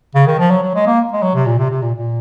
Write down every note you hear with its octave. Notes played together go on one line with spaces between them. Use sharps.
C#3
D#3
F3
F#3
F#3
G#3
A#3
G#3
F#3
C3
A#2
C3
C3
A#2
A#2